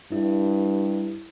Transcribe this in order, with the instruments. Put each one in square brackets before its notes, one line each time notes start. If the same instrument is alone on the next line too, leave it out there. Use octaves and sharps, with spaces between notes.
[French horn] G2 [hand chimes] E4